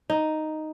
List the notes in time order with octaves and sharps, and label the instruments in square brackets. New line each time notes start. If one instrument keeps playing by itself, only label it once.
[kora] D#4